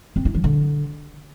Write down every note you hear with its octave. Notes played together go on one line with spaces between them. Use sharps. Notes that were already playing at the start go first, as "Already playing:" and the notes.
C4
E4
E3
D3